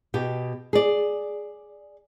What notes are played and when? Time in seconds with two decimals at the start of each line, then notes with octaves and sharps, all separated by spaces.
0.14 B2 G4
0.73 G#4 D5